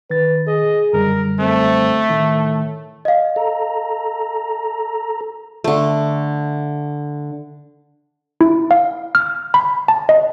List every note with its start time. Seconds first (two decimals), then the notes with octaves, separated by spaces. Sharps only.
0.10 D#3 B4 A6
0.47 G#4 D#5
0.93 F#2 D3 G3 A#4
1.40 A3 C4
2.10 A2 D#3
3.05 D#5 F5
3.36 A4 A#5
5.64 D3 A3
8.41 E4
8.71 F5
9.15 F6
9.54 B5
9.88 A5
10.09 D#5